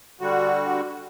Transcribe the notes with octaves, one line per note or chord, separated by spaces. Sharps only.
D3 G3 F#4